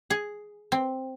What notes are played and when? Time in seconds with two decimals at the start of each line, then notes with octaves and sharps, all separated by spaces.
0.10 G#4
0.72 C4